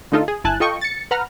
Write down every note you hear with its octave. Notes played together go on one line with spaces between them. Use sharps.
D3 A3 D#4 F4 A4
G#4
G1 E4 G#5 A5 F#6
F4 A4 D#5 G5 C#6
A6 C#7
B4 F#5 A#5 F6